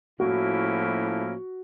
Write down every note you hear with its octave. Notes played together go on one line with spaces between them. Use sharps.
A2 F3 A#3 C#4 E4 F#4